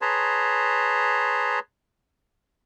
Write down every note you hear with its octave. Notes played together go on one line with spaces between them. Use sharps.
G#4 B4 C#5 A5 A#5 C6